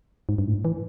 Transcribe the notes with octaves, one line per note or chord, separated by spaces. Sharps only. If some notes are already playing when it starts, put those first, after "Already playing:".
G#2
G2
A2
E3